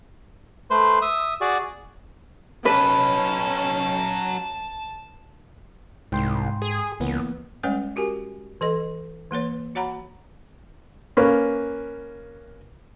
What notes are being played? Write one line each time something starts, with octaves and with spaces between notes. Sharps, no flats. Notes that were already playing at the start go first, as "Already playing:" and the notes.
A3 B4 C5 C6
E5 D#6
F#4 G#4 D5
F#3 C#4 B4 D#5 A5
C2 G#2 G5 C6
G#4
C#2 E3 A#3 B3
G3 G#3 C#4 B4 C#5 F#5
F#4 G4 A#4 G#5
E3 A4 D#5
E3 A#3 B4 C#5
F#4 C#5 F#5 A#5 B5
A#3 C#4 B4